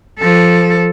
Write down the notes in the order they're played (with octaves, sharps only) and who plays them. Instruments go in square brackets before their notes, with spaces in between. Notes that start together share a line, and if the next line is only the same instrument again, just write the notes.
[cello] F3 A4